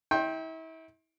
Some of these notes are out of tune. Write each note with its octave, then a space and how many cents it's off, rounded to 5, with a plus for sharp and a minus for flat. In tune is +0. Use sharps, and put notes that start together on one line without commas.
E4 -35 G5 +0 C6 +40